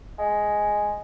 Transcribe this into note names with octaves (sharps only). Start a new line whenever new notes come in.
G#3